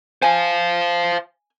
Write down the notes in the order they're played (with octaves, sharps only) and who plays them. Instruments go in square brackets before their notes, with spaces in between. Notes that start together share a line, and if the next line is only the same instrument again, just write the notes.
[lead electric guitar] C5 F5 [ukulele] G#5